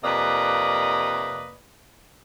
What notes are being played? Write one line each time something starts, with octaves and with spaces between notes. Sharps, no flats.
F2 C3 A#3 B4 D5 D#5